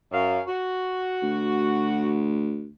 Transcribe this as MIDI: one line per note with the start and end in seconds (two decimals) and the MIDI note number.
0.12 0.39 42
0.12 0.39 77
0.47 2.15 66
1.23 2.69 38